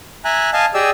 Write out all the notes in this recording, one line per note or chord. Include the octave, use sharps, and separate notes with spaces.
E5 G#5 A#5 F#6
D#5 F5 G#5 A5
G4 G#4 D5 D#5 E6